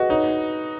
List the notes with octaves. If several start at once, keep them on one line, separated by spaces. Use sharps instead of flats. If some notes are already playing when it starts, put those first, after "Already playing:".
Already playing: F#4 G#4 B4 D#5
D#4 C#5